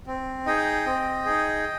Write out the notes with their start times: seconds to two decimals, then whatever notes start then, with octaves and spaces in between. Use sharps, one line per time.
0.07 C4
0.46 D#4 G#4 D#5 G5
0.86 C4
1.25 D#4 G#4